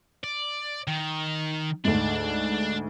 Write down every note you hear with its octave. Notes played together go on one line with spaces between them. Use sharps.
D5
D#3
D2 G#2 D4